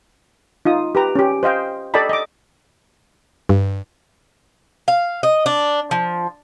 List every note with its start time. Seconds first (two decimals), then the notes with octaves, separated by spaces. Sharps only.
0.65 D#4 F4 D#6
0.95 G4 B4 A#5
1.15 C#4 G4
1.43 C5 D#5 F5 G5
1.94 A4 D5 D#5 G5 A5 B5
2.09 D#5 D6
3.49 G2
4.88 F5
5.23 D#5
5.46 D4
5.91 F3